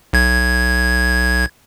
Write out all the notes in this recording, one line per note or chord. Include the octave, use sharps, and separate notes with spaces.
B1 G#6